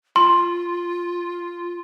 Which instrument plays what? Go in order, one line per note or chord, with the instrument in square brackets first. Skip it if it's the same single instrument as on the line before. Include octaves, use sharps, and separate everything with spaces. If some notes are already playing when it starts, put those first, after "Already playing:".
[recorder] F4 [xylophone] C6